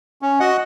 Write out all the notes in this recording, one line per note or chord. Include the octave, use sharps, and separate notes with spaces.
C#4
F#4 D#5 F#5